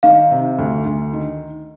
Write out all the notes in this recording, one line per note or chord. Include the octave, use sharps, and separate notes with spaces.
D#3 F5
C3
D2
D2
D#3